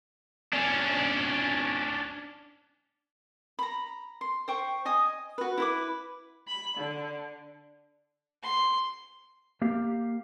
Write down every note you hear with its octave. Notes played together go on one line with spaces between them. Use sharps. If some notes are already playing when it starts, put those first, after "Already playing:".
C#4 D4
A#5 B5
C6
C5 G5 C#6
D#5 G#5 D#6
F#4 B4
E4 B4 D6
B5
D3
C6
A#3 G4 F5